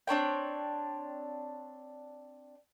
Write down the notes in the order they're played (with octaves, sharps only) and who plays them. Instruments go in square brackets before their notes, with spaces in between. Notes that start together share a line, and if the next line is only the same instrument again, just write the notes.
[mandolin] C4 D4 C#5 G5